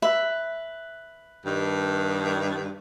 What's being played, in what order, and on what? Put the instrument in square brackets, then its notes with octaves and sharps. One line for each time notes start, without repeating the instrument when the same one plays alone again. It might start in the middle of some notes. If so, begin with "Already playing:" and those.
[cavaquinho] B4 E5 B5
[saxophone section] G2 D#3